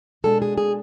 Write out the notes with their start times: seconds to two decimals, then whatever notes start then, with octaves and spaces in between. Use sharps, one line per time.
0.24 B2 G#3 D4 A4
0.42 G#4
0.58 G#4